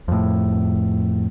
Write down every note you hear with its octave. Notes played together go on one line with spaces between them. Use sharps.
F2 A2